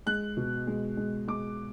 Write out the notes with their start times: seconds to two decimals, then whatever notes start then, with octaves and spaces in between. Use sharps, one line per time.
0.06 G#3 F#6
0.37 B2
0.67 G#3
0.97 G#3
1.28 G#3 D6